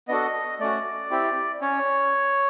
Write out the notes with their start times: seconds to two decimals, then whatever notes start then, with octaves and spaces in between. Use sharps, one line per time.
0.08 B3 D4 F#4 A4 D#5
0.60 A3 C#4 F#4 D5
1.10 C4 E4 G4
1.61 C#4 C#5